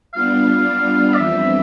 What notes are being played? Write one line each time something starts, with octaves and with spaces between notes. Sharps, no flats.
G3 B3 D4 F4 F5
D5
F2 E3 G3 C4 E5